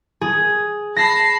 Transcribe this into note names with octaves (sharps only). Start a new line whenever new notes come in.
G#4
A5 B5 A#6 C7